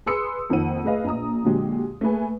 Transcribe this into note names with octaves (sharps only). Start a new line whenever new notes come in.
G#4 B4 C6 D#6 E6 C#7
F2 D#3 A#3 C5 F#5 D#7
A3 G#4 B4 D#5 F5
A#1 A#2 A#5 D#6
A#2 D3 F#3 G#3 G4
A3 A#3 G#4 B4 G#5